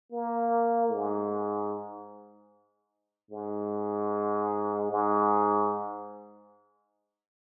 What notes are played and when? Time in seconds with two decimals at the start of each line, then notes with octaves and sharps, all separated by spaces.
0.12 A#3
0.92 G#2
3.31 G#2
4.91 G#2